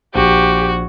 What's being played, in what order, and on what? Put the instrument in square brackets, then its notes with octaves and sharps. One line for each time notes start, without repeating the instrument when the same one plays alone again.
[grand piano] A#1 [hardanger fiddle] F#4 [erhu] G4